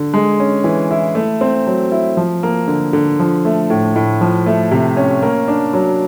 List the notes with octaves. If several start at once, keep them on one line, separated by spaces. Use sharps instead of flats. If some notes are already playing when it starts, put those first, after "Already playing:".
Already playing: D3
G#3
C#4
E3
E4
A3
C4
F#3
E4
F3
A#3
D3
D3
F3
A3
A2
A2
F3
A3
C3
C#4
A#3
D4
F#3